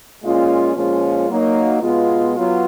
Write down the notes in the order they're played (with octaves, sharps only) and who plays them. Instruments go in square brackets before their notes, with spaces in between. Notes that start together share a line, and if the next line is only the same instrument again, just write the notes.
[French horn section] A#2 G#3 C#4 F4
A#2 F3 G#3 C#4 F4
F#3 A#3 D#4
B2 G#3 B3 F4
F#3 B3 F4